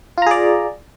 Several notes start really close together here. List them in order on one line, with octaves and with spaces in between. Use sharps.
F4 A#5 G#4 D5